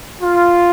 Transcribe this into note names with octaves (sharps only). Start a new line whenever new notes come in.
F4